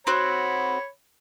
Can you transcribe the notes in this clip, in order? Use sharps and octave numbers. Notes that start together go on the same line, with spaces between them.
C4 F#4 C#5 B5